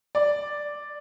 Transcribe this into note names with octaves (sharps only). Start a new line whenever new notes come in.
D5